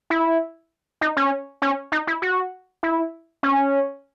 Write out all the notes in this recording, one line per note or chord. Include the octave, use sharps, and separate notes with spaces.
E4
D#4
C#4
C#4
D#4
E4
F#4
E4
C#4